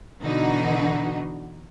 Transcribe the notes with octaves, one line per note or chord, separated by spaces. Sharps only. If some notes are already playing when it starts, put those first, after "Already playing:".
B2 D3 E3 D#4 F#4